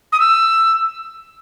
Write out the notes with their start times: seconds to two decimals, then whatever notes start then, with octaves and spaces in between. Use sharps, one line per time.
0.12 D#6
0.20 E6